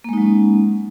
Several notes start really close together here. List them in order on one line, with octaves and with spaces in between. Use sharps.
A#3 G#3 D#4 F#3 C#4